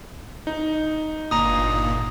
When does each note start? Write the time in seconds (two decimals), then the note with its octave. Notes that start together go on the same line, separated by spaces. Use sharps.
0.47 D#4
1.31 G1 A#2 A#5 D#6